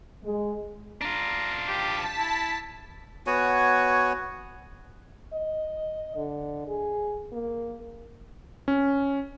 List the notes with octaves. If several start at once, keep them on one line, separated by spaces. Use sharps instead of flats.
G#3
D4 F4 A#5
G4 A5 B6
E4
B3 F#4 C#5 G#5
D#5
D3
G#4
A#3
C#4